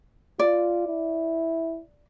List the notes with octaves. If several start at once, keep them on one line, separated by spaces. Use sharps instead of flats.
F4 D5
E4